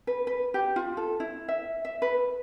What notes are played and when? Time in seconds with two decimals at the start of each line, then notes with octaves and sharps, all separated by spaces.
0.07 B4
0.27 B4
0.54 G4
0.76 F4
0.97 A4
1.20 E4
1.48 E5
1.85 E5
2.02 B4